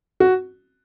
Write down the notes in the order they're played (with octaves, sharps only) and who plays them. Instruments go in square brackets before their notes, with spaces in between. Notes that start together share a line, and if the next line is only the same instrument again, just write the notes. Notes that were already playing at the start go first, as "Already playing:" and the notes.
[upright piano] F#4